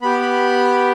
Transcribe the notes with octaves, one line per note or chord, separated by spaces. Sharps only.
B3 G4 B5